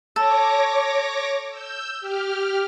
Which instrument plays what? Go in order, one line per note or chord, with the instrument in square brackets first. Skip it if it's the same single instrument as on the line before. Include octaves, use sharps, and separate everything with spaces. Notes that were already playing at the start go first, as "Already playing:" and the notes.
[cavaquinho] A4 [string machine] C#5 D6 A#6
[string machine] E6 G6
G4 F6